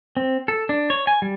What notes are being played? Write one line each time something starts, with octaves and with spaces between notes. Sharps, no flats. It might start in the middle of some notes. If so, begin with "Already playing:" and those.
C4
A4
D4
C#5
G#5
G3